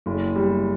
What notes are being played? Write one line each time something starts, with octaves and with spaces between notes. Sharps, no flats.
F#1
G3